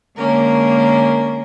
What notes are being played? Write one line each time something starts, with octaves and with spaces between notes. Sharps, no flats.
D3 G#3 A#3 C#4 A#4